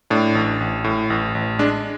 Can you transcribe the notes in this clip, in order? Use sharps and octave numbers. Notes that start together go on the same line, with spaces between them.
A2 D4
A1
A1
A2
A1
A1
G#3 D4